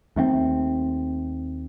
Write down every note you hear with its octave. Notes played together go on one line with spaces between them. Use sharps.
D#2 A3 A#3 C4